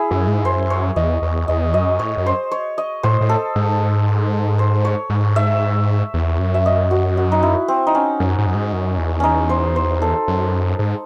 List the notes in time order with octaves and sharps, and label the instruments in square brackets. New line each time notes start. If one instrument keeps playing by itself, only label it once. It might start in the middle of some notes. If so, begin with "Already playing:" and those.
Already playing: [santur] E4 G#4
[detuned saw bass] F#2
G#2
[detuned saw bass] F#2 [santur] C5
[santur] C#5
[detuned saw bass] E2 [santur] D#5
[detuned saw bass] E2
[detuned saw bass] E2 [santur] D#5
[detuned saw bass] F#2 [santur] D#5
[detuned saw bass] A2 [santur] C#5
[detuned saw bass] F#2
[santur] C5
C#5
D#5
[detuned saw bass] A2 [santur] C5
[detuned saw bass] A2
[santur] A4
[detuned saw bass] G#2
[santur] C5
C#5
[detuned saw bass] G#2
[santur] E5
[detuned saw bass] E2
F#2
[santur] E5
D#5
F#4
F#4
D#4
E4
C4
D#4
C#4
[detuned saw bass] F#2
G#2
F#2
G#2
F#2
E2
[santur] C#4 D#4
C5
C5
A4
[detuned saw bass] F#2
G#2